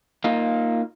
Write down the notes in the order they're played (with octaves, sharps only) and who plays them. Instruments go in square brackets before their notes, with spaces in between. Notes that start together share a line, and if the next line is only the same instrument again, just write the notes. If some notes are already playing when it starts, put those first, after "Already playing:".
[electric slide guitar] A#3 D#4 F4